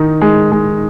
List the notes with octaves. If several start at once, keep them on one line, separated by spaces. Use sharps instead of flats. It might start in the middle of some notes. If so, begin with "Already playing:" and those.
Already playing: D#3 D#4
G#3
G#3